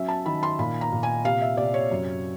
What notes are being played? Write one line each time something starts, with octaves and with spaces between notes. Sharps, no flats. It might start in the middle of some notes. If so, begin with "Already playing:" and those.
Already playing: F#3 C#4 E5
A5
D#3 B5
C6
A#2 B5
A#5
A#2
G#5
C3 F5
E5
C3 D5
C#5
F#2